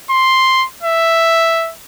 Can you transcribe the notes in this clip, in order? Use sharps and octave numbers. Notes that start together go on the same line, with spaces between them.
C6
E5